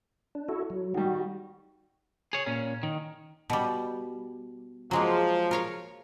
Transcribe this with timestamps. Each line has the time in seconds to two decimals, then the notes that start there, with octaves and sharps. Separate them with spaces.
0.35 D4
0.49 E4 F#4 A4
0.70 F#3
0.94 D#3 G3 F#4
2.33 G#4 C#5
2.46 A#2 C#4
2.83 D#3
3.50 B2 G3
4.91 F3 F#3 G#3 A#3
5.51 A#4 C#5 F5